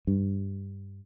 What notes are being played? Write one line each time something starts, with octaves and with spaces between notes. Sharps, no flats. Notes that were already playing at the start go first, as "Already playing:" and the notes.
G2